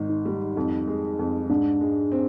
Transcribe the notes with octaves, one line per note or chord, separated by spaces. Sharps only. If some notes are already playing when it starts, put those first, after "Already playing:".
Already playing: G#1 D#3
D#4
G3
F2 D#4
G#3
F2
G#2 D4
G#3
C4